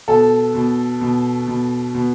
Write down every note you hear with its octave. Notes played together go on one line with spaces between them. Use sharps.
B2 A4
B2
B2
B2
B2